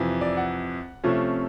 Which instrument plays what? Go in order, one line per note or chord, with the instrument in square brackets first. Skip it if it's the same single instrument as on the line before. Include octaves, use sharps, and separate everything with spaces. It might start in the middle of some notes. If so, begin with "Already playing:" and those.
Already playing: [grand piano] F2 C3 E3
D5
F#5
C3 F3 A3 C#4